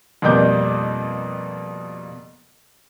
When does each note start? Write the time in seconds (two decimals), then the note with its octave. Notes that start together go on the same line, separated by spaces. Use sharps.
0.22 F2 B2 G3 A#3 D6 G6